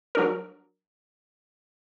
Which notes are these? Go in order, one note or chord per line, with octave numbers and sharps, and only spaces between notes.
F#3 D4 A#4